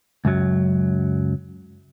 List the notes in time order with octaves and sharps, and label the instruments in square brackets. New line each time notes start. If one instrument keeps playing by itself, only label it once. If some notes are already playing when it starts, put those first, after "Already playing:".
[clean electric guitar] C#2 F#2 F#3